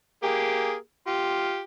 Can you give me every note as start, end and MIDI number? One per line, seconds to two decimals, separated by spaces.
0.23 0.74 58
0.23 0.74 67
0.23 0.74 68
1.07 1.60 65
1.07 1.60 67